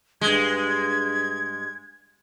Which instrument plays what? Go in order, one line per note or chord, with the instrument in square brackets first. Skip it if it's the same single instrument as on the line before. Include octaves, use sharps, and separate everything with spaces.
[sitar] G2 G#3 [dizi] G#6